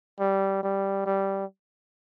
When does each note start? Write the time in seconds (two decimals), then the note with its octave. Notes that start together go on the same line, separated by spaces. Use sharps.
0.19 G3
0.63 G3
1.06 G3